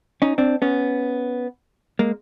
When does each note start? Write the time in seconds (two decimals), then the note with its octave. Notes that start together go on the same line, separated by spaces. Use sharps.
0.22 C#4 D#4
0.38 C4 D4
0.62 B3 C#4
1.99 G#3 A#3